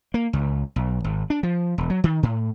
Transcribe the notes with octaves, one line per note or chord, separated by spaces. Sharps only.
A#3
C#2
B1
G#1
D4
F3
E1
F#3
D#3
A2